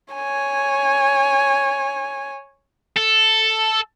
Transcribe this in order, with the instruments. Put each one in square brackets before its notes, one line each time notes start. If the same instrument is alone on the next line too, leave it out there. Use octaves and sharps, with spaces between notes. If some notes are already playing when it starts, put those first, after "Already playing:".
[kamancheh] C#5 G#5
[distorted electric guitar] A4